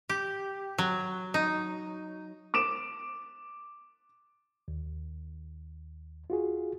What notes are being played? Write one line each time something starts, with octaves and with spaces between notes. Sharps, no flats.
G4
F#3
D#4
D6 D7 E7
D#2
F4 F#4 G#4